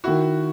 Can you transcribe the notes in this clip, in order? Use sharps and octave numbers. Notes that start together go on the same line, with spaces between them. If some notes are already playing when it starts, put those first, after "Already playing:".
D#3 E4 F#4